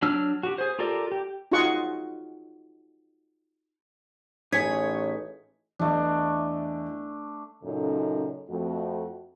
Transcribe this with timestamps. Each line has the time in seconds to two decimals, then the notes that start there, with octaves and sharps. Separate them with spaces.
0.02 F#3 D4 E6 F6
0.43 F#4 G4
0.58 G#4 C5
0.79 F4 G4 A4 A#4 D5
1.12 G4
1.52 D#4 F4 F#4 G#4 F#5 C#6
4.52 A1 D#4 G#4 C#5 G#6 B6
5.79 E2 E3 A3 D4 D#5
7.63 F#2 A#2 C#3 D#4 A4
8.50 F2 A3 F#4